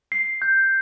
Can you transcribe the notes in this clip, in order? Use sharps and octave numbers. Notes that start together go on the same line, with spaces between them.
C7
G6